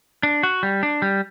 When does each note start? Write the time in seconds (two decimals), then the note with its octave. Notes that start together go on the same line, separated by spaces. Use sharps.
0.23 D4
0.43 F#4
0.63 G3
0.83 D4
1.02 G3